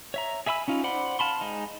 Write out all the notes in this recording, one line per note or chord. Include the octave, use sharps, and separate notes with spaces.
C#5 E5 A#5
G#4 E5 G#5 B5 E6
C#4 D#4 F4
C5 D5 F#5 B5 C6
F5 A5 B5 C6
G#3 D#4